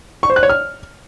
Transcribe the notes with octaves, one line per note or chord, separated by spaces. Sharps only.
C#6
C5
F#6
C#5
F6